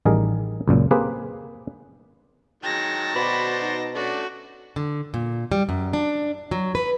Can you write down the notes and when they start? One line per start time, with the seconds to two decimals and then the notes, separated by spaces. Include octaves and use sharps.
0.05 A1 D#3 G3 G#4 A#4
0.68 C#2 F#2 A#2
0.91 A#3 C4 G4 G#4 B4
2.64 D#3 F#3 G#3 G5 A5 A#6
3.15 B2 F#4 C5 D5 B5
3.61 D#4
3.95 A3 C#4 D4 F#4
4.76 D3
5.14 A#2
5.52 G3
5.69 F#2
5.93 D4
6.51 F#3
6.75 B4